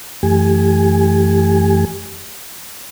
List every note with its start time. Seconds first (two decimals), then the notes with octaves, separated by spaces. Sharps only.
0.23 F#2 E3 A3 G4 G#5